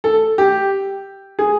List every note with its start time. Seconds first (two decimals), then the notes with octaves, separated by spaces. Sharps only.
0.04 A4
0.38 G4
1.39 G#4